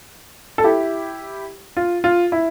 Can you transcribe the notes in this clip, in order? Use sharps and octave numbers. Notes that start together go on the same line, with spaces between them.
A4
E4 G4
F4
F4
E4